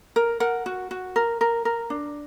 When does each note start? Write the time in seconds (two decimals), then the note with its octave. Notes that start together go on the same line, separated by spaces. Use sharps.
0.16 A#4
0.40 A#4 F#5
0.66 F#4
0.91 F#4
1.16 A#4
1.41 A#4
1.65 A#4
1.90 D4